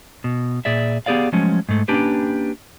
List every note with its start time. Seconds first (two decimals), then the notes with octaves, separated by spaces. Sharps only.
0.24 B2
0.65 A#2 G#4 D5 E5
1.06 B3 G4 G#4 D5 F5
1.33 F3 F#3 G#3 A3 C#4
1.69 G#2 A3
1.88 A#3 C#4 D4 G4 B4